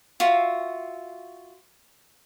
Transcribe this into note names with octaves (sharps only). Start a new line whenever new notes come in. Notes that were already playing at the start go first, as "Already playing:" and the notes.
F4 F#4 E5